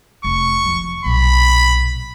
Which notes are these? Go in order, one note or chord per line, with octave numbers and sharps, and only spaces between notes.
F1 C#6
F2 D#3
B1 A#2 B5